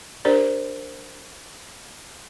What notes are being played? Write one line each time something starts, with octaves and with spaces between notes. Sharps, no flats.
D4 G4 A#4 C5 D5